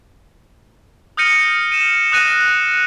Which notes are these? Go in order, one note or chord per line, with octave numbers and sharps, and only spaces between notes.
D#6 F6 G6 A#6 C#7 D#7
D#7 E7
D#6 F#6 A#6 D#7